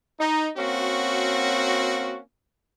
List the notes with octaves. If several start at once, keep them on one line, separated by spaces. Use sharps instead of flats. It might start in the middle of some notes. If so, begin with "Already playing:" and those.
D#4
A#3 C4 C#4 F#4